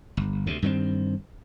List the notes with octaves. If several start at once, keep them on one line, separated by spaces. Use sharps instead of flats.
G1
D2 C3
G2 D#3 G#3 C4